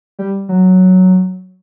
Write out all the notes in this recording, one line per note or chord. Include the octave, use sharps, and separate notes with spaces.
G3
F#3